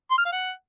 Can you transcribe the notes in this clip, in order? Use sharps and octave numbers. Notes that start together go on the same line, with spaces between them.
C6
F6
F5
F#5